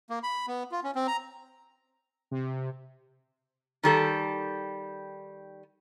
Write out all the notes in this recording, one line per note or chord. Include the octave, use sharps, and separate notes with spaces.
A#3
B5
B3
F4
C#4
C4
A#5
C3
D#3 G3 A4